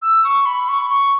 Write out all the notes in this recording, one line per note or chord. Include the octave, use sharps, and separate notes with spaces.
E6
C#6
B5
C#6
C#6